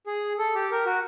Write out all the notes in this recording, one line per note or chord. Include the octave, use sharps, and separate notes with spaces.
G#4
A4
G4
A#4
F#4